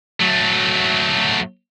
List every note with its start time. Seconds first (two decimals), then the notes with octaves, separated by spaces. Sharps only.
0.20 F#3 A3